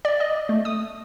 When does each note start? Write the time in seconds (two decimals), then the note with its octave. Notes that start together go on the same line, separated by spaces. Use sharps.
0.05 D5
0.20 D#5
0.49 A3
0.65 D#6